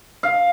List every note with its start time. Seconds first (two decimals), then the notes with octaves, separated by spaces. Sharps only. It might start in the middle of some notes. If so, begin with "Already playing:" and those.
0.23 F5